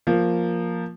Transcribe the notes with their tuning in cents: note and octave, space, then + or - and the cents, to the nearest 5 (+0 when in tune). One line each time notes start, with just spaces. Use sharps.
F3 +0 A#3 +0